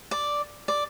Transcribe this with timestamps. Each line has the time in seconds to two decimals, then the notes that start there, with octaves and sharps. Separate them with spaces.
0.11 D5
0.68 D5